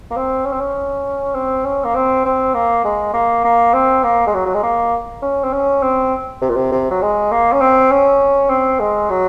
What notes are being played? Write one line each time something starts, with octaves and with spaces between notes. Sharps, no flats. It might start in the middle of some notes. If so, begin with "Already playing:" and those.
A#3
C4
C#4
C4
C#4
C4
C#4
A#3
C4
C4
A#3
G#3
A#3
A#3
C4
A#3
G#3
F#3
F#3
G#3
A#3
C#4
C4
C#4
C4
C3
A#2
C3
C3
F#3
G#3
A#3
C#4
C4
C#4
C4
G#3
F#3